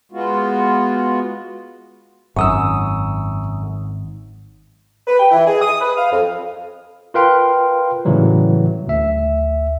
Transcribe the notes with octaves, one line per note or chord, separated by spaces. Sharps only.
G#3 B3 F4 F#4
G#1 F#2 C#6 D#6 E6
B4
G5
E3
G#4
D#6
B4
F5
F2
F4 A#4 B4 F5 G5 C6
A2 C#3 E3 F#3 G3
D2 E5